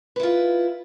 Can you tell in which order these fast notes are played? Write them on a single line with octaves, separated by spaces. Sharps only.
B4 E4 F4